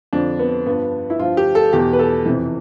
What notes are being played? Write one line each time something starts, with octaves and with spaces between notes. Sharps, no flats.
F2 D3 F3 D4
B3
G2 F3 B3
E4
G2 F3 F4
G4
A4
E2 B2 G4
B4
A4
F2 C3 E3